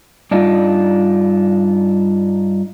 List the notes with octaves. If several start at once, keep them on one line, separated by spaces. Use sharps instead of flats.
G2 D4 D#4 F4